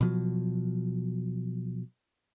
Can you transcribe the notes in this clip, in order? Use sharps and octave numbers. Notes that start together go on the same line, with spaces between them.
B2 F3 F#3